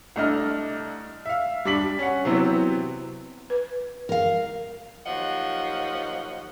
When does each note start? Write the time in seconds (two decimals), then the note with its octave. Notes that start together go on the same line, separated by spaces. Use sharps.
0.16 C2 A3 D4 D#5 F6
1.26 E5 F5
1.65 G3 D4 D5 B6 F#7
1.99 C#4 F#5
2.25 C3 E3 F#3 B3 C4
3.50 B4
4.09 A#4 F5
5.06 D#2 F3 F#3 D#5 F#5